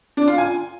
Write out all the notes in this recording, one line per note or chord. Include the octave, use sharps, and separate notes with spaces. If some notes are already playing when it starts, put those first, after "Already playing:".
D4
F4
G#5